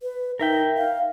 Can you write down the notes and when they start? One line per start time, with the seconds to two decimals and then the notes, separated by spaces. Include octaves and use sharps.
0.02 B4
0.39 D#4 A#4 E5 G5
0.77 F5